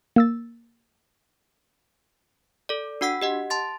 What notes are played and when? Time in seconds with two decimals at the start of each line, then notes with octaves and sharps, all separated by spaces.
0.16 A#3 E6 A6
2.69 A4 D5
3.01 D4 F#4 F#5 E6 B6
3.22 G4 D#5 F#5
3.50 A5 C6 A6